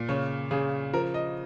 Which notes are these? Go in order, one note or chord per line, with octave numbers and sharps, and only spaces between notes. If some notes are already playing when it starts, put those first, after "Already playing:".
Already playing: A#2
C#3 C#5
C#3 G#4
F3 A#4
D#5